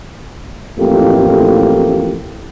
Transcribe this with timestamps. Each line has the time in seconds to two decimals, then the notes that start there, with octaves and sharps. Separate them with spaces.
0.78 A1 F2 A2 A#3 G4